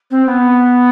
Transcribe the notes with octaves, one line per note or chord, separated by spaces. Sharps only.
C4
B3